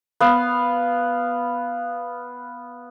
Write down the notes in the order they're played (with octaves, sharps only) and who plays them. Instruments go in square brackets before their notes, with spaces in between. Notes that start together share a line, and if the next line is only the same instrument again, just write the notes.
[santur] B3 F5